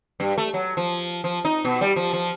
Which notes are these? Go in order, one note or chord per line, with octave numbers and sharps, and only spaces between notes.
G2
A3
F#3
F3
F3
D#4
B2
G3
F3
F3